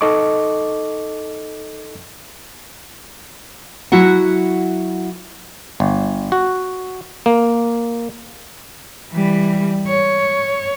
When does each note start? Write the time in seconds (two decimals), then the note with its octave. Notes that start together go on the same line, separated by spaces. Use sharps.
0.01 D#4 A4 D#5 C#6 D6
3.92 F#3 E4 F#4 F#5
5.80 G1
6.32 F#4
7.26 A#3
9.12 E3 G3
9.88 C#5